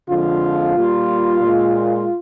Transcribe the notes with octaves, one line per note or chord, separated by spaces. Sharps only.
F2 D3 F3 G#3 F4
A#2 G3 A#3
A#2 G#3